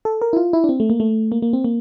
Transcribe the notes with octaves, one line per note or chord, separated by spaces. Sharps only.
A4
A#4
E4
F4
E4
D4
C4
A3
A#3
A3
A#3
A#3
C4
A#3